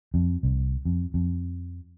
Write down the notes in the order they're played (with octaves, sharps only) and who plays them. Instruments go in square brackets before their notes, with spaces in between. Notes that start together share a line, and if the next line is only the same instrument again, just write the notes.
[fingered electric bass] F2
C2
F2
F2